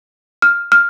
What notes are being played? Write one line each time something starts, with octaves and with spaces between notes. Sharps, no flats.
F6
F6